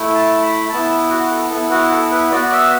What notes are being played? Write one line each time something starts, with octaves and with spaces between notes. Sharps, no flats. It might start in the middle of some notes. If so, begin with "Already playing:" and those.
Already playing: A3 E4
A5
B5
B3 E4 A5
F#4
A4
B3 E4 A4
F#4
A4
B4
B3 F#4 D5
E5